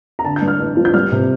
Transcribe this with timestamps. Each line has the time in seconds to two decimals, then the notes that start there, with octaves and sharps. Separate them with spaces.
0.19 A#5
0.25 D3 A5
0.36 G6
0.42 G2
0.48 F6
0.59 A1
0.77 F3
0.85 G6
0.94 G3 F6
1.12 C3